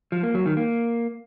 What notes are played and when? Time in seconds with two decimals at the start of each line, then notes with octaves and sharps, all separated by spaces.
0.12 F3
0.23 A#3
0.35 F#3
0.46 D#3
0.57 A#3